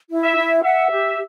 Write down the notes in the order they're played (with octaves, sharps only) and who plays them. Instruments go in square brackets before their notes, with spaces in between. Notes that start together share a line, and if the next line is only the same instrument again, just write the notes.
[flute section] E4
[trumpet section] E5
[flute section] E4
[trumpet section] E5 [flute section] F#5
[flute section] G4